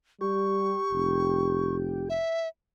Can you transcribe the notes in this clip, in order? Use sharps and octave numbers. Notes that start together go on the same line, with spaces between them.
G3 G4 C#6
F1
E5